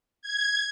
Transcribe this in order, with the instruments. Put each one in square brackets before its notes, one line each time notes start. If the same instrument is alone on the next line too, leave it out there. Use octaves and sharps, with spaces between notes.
[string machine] G#6